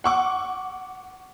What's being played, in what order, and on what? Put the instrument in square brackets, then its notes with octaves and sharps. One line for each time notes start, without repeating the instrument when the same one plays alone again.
[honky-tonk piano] F#5 C#6 D6